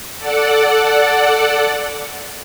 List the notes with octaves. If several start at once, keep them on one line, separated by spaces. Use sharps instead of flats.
A4 D5 F#5